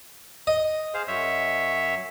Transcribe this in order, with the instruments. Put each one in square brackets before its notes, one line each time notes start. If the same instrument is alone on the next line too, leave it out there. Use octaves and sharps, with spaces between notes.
[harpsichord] D#5
[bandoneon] G#4 C5 F5
F#2 C#5 E5